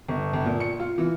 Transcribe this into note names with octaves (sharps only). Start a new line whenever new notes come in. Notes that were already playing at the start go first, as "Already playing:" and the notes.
G1
G1
A#2
C#7
F4
E3